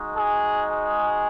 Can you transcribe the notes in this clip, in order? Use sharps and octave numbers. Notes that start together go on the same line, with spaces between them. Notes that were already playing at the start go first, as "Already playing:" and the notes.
Already playing: G#3 D#4 F#4
G#4
G#4